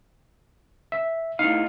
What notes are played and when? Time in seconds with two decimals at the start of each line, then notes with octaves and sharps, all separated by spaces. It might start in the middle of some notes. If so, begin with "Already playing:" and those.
0.92 E5
1.39 A2 D#4 F5